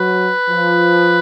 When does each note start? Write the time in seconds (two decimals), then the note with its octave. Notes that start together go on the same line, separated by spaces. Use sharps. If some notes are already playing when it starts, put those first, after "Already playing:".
Already playing: F#3 B4
0.49 F3